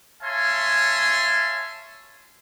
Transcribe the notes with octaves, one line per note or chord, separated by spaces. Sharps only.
C#5 E5 F5 G#5 A5 C6